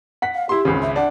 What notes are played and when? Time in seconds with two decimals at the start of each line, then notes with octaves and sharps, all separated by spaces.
0.22 F#5 B6
0.35 F5
0.49 E4 G4 C6
0.65 G#1 C#2 C#3
0.82 E5
0.96 D4 F#5